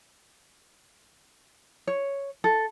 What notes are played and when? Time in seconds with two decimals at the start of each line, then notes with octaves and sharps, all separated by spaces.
1.87 C#5
2.44 A4